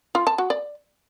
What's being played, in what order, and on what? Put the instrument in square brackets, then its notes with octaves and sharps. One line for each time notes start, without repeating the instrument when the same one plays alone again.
[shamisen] F4
A5
F#4
D5